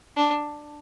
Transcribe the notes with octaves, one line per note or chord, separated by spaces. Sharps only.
D4